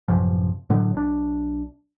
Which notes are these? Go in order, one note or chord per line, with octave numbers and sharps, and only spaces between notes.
A1 F#2 C3 F3
A2 D3 D#3 F#3
B1 D4